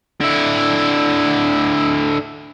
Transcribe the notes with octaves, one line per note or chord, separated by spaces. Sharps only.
D3 E4